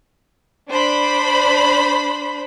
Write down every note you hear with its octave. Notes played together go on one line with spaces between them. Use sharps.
D4 C5 B5